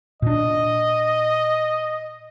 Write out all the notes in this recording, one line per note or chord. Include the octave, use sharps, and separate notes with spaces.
A#2 D4 D#5